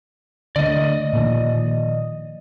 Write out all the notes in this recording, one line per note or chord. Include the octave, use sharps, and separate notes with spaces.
D3 A3 D5 D#5
A#2 D#3 F3